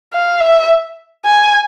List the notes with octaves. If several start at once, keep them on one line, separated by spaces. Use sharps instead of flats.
F5
E5
G#5